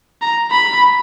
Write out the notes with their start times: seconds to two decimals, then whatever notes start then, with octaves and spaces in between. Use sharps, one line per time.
0.22 A#5
0.51 B5